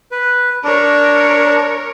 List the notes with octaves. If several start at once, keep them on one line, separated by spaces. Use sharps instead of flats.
B4
D4 A#4 C#5